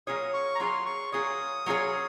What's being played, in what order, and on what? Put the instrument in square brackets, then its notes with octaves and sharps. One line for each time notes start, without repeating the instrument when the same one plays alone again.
[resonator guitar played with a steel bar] F#3 A#3 F4 G#4 C#5 [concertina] D#6
[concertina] C#6
A#5
[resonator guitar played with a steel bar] F#3 A#3 F4 G#4 C#5 [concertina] C6
[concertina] C#6
[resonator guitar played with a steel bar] F#3 A#3 F4 G#4 C#5 [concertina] D#6
[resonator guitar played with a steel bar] F#3 A#3 F4 G#4 C#5